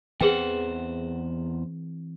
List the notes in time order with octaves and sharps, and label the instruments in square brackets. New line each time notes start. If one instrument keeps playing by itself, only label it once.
[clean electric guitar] E2 C5 F#5 [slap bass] E3 C4 [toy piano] G#4 B4 G5